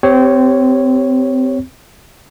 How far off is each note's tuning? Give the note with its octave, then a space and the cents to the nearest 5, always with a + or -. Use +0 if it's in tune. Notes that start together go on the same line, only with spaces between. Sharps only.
C4 -25 G4 +0 C#5 +0